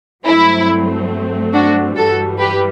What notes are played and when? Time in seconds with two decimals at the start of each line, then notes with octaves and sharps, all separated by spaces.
0.25 G2 F#3 A3 C4 E4
1.53 D4 F#4
1.96 G2 E3 G3 F#4 A4
2.39 G4 B4